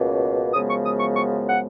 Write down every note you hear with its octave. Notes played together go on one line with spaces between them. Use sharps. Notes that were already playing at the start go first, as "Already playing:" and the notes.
Already playing: C#2 B2 A#3 C#4
F#2 C#3 F3 G#3 B3 D#6
C#6
D#6
C#6
C#6
F#5